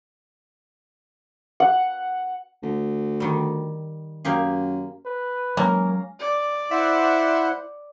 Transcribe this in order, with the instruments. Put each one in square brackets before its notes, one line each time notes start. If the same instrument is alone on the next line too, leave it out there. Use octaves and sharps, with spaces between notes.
[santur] F#5
[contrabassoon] D2
[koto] D#3 G3
[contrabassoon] F#2 [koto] A#3 G4 G#4
[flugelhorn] B4
[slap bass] F#3 G#3 [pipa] A#3 [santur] C#4 F5 A#5
[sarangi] D5
[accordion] E4 C5 F#5 [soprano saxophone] E5